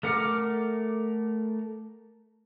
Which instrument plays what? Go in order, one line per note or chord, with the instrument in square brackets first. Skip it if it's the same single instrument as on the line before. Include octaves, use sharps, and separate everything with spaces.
[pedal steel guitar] A3 A#4 F#5 D6 F6